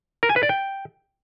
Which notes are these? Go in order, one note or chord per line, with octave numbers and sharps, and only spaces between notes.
A#4
G#5
B4
D5
G5